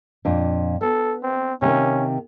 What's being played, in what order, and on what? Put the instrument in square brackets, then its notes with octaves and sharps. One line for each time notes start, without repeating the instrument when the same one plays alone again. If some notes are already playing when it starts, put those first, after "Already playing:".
[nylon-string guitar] F2 A#2 D4
[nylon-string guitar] B3 [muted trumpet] A4
[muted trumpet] C4
[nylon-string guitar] C3 D#3 A#3 [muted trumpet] C#4